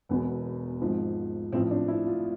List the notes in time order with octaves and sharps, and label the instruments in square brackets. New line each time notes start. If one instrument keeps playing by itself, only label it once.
[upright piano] E1 E2 B2 B3
G#1 G#2 F3
A1 A2 F3 C4
D4
E4
F4